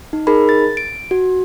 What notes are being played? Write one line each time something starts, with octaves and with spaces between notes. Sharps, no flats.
D#4
D#4 G#4 A#4 B5
A6
D7
F#4